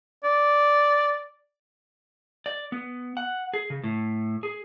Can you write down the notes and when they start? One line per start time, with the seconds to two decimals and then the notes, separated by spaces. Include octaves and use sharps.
0.24 D5
2.46 D5
2.72 B3
3.17 F#5
3.54 G#4
3.70 C#3
3.83 A2
4.43 G#4